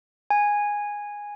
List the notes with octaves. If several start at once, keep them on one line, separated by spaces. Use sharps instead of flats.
G#5